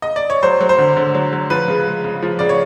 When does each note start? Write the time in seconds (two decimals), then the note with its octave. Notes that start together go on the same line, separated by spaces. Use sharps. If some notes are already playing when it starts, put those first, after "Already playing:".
0.02 D#5
0.16 D5
0.30 C#5
0.43 F#3 C5
0.61 F#3
0.69 C5
0.78 D3
0.97 D3
1.15 F#3
1.33 F#3
1.50 F3 B4
1.68 C#3
1.87 G#3
2.04 C#3
2.22 F3
2.39 C#3 D5
2.49 C#5